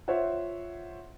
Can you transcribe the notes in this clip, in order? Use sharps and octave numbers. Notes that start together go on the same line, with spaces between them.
F4 C5 C#5 E5 F#5